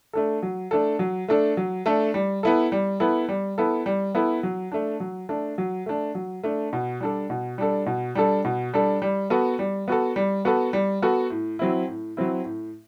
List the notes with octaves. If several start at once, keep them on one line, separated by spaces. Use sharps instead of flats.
A3 D4 A4
F#3
A3 D4 A4
F#3
A3 D4 A4
F#3
A3 D4 A4
G3
B3 E4 A4
G3
B3 E4 A4
G3
B3 E4 A4
G3
B3 E4 A4
F#3
A3 D4
F#3
A3 D4
F#3
A3 D4
F#3
A3 D4
B2
G3 D4 A4
B2
G3 D4 A4
B2
G3 D4 A4
B2
G3 D4 A4
G3
B3 F#4 A4
G3
B3 F#4 A4
G3
B3 F#4 A4
G3
B3 F#4 A4
A2
F#3 C4 E4
A2
F#3 C4 E4
A2